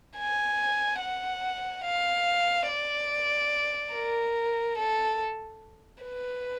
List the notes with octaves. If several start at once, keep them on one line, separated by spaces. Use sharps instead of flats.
G#5
F#5
F5
D5
A#4
A4
B4